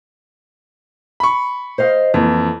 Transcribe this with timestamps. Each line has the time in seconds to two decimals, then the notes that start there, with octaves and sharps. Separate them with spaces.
1.20 B5 C#6
1.78 C5 D#5 F5
2.14 F2 E3 A#3